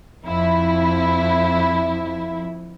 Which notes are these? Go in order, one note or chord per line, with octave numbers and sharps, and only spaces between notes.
F2 E4